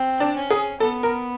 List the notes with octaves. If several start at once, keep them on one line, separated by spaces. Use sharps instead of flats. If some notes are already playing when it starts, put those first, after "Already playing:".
Already playing: C4
D4
C#4
G#4
B3 A4
A#4